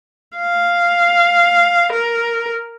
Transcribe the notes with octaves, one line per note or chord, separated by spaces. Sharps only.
F5
A#4